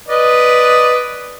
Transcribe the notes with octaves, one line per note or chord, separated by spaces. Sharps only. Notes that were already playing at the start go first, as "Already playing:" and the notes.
B4 D5 D#5